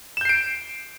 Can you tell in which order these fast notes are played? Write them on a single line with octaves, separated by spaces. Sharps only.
E7 G6 C7 D7